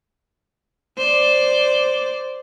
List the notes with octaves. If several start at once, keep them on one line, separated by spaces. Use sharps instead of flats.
C5 D5